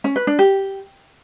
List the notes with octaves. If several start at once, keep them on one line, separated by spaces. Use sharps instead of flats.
C#4
B4
D4
G4